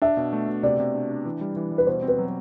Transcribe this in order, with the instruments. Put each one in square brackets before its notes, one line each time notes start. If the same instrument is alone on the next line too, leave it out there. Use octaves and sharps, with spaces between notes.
[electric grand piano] D4 [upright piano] E5
[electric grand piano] B2
A3
B2
[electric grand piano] C3 [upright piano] D5
[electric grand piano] C3
D4
D4
E3
G3
E3
G3
[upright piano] B4
[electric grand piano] B2 [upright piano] C5
[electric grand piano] C4
[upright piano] B4
[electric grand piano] F#3